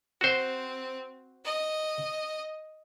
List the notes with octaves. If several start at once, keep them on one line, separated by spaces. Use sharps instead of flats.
C4 F#4 C5
D#5